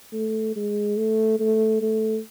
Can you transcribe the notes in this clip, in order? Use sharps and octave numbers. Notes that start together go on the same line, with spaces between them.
A3
G#3
A3
A3
A3